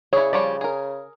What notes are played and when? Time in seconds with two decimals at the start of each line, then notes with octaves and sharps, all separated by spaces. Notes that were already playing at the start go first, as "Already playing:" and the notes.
0.13 C#3 E4 G#4 C#5 D5
0.33 F3 G3 C#5 D5
0.61 G#4 A#4